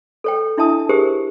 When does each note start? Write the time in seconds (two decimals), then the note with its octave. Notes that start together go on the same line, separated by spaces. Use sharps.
0.24 A4 C#5 G5
0.57 D4 E4 E5 A5 D#6
0.89 G4 G#4 A#4 C5